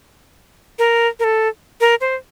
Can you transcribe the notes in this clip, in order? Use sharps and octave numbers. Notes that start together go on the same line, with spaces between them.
A#4
A#4
A4
A#4
C5